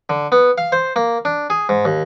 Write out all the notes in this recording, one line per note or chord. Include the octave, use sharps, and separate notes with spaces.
D3
B3
F5
C5
A#3
D4
G#4
G#2
D#2